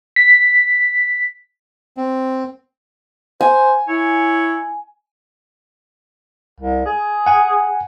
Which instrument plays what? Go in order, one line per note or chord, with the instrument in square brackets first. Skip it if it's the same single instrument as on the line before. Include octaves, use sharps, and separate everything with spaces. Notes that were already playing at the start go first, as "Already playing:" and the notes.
[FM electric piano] B6
[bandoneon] C4
[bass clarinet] C5 [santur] G#5
[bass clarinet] E4 [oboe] C#5
[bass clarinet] C2
G#4
[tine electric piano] F#5 G#5